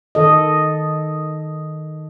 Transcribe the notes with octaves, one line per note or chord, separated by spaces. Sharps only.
D#3 A4 D#5